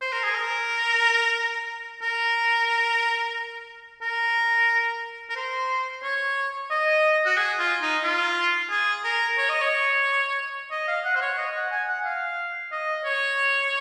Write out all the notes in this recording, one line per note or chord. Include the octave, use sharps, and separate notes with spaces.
C5
A#4
G#4
A#4
A#4
A#4
A#4
C5
C#5
D#5
F#4
G#4
F4
D#4
F4
G#4
A#4
C#5
D#5
C#5
D#5
F5
F#5
C5
C#5
D#5
F#5
G#5
F#5
F5
D#5
C#5